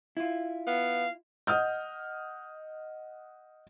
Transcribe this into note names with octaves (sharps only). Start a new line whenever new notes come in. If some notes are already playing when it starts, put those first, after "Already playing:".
E4 F4
B3 F5
D#5 F#5 D#6 F6 G6